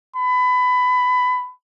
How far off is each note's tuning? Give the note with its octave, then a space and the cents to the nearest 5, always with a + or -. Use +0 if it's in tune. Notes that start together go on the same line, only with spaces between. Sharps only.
B5 +20